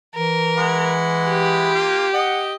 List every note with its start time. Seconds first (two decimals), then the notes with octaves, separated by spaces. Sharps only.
0.15 E3 A#4
0.58 G#3 E4 F#5
1.29 G4
1.74 A#3 F4
2.14 D#5 F#5